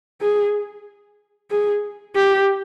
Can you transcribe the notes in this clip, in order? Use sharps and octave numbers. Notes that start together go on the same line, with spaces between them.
G#4
G#4
G4